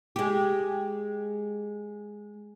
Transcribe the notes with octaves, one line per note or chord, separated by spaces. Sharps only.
G#3 G4